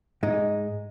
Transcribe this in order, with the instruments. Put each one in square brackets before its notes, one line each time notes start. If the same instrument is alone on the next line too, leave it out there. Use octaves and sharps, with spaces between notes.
[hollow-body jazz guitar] G#2 G#3 D#4